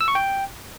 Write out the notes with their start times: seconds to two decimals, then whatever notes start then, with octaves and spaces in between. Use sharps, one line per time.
0.01 E6
0.08 C#6
0.15 G5